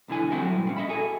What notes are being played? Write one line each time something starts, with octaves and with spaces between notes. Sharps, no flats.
B1 D3 E4 G#5
F#3 C4 E4 F#4 G4
A2 G3
A#2 C4 C#4
D#5 E5 B5
F#4 G#4 A4